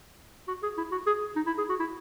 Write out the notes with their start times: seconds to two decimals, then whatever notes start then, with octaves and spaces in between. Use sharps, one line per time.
0.48 F#4
0.63 G#4
0.77 E4
0.91 F#4
1.07 G#4
1.36 D#4
1.46 E4
1.58 G#4
1.69 F#4
1.79 E4